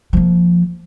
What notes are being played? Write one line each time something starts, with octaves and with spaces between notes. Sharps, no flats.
F3 A#3